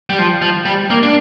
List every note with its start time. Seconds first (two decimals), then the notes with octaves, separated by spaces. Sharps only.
0.10 G3
0.19 F3
0.42 F3
0.65 G3
0.90 A#3
1.03 D4